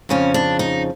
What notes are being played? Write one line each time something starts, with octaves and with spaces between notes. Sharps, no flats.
F2 C#3 F3 C#4
D4
D#4